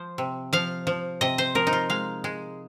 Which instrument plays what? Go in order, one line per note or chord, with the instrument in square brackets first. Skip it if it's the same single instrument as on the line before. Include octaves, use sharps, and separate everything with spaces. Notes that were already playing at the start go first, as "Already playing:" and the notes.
Already playing: [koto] F3 C5
C3
F3 F5
F3
C3 D#5
C5
F3 A#4
D#4
F4
G#3 F5
G#3